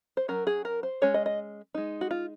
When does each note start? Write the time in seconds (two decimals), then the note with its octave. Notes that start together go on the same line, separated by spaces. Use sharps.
0.17 C5
0.28 F#3 C#4 A#4
0.47 G#4
0.65 A#4
0.83 C5
1.02 G#3 C#4 C#5
1.14 D#5
1.26 D#5
1.74 G#3 D#4
2.01 F#4
2.11 F4